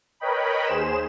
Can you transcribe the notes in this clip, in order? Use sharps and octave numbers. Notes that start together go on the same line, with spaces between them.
A#4 B4 C#5 D#5 G5 B5
D#2 G#4 C5 E7